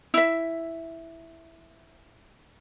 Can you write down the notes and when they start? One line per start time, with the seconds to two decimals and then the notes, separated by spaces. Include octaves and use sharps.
0.14 E4 E5